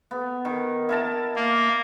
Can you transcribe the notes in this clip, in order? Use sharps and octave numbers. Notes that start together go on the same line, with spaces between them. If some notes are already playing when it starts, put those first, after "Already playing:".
B3
D#3
E4 A#4 A5
A#3